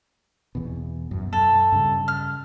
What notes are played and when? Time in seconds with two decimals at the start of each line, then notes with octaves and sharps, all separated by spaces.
0.55 E2 B2
1.11 F#2 B2
1.33 F#2 A4
1.72 G2 C#3
2.08 F6